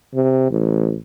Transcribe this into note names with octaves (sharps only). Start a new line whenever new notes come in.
C3
A1